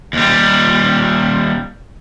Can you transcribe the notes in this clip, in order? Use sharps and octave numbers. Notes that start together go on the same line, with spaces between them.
D#2 G3